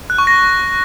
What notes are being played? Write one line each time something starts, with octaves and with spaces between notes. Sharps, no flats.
F#6
C#6
A#6